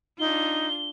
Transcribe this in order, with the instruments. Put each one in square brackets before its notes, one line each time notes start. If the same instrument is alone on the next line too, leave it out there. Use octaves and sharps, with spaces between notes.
[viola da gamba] D4 F4 [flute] D#4 [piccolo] G7